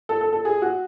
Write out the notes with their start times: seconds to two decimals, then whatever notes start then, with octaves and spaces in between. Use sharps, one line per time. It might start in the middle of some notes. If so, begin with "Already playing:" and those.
0.09 A4
0.21 A4
0.33 A4
0.45 G#4
0.62 F#4